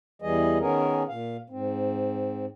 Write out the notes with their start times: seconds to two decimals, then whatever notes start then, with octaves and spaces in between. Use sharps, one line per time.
0.22 E2 E3 G3 G#4 D#5
0.60 D#3 B3 C#4 G#4 A#4
1.09 A#2 F5
1.50 G#2 C4